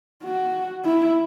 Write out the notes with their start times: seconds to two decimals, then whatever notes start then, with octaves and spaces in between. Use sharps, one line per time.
0.23 F#4
0.85 E4